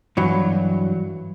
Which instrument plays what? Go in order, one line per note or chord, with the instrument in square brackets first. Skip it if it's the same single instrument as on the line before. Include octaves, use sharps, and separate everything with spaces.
[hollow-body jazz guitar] G2 E3 F#3